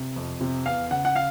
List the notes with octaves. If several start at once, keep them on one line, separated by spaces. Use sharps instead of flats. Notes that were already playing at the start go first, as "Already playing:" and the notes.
Already playing: C3
F2
C3
E2 F5
C#3 F#5
F#5
F5